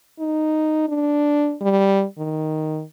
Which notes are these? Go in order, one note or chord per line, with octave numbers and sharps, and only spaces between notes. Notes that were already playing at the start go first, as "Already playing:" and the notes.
D#4
D4
G3
D#3